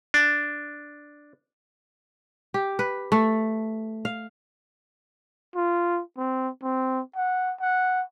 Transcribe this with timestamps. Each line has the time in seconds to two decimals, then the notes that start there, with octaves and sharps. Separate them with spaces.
0.14 D4
2.54 G4
2.79 B4
3.12 A3
4.05 F5
5.56 F4
6.18 C4
6.63 C4
7.16 F#5
7.60 F#5